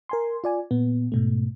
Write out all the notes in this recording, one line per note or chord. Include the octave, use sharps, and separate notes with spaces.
A#4 G#5 C6
F4 D5 G#5
A#2 B3
G#2 B2 A3